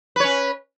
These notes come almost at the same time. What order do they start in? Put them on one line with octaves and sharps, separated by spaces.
B4 C#5 C#4